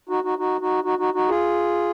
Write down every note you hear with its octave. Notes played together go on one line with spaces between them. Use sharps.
D#4 F#4
D#4 F#4
D#4 F#4
D#4 F#4
D#4 F#4
D#4 F#4
D#4 F#4
F4 G#4